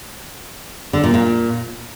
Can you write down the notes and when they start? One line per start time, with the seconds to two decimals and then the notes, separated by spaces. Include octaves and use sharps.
0.93 D3
1.04 A#2
1.14 A#2